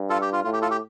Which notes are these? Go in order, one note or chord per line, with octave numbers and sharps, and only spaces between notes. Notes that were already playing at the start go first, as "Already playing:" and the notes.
Already playing: G2
F4 A4
G4
F4
A2 F4
G4
F4 A4
G4